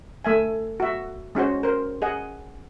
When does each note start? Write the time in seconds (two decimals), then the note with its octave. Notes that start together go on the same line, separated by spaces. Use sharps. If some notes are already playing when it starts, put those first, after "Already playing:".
0.25 A3 E5 G#5
0.80 F#4 E5
1.35 G#3 C#4 F#4 C5
1.63 A#4 C5
2.02 G#4 D#5 F#5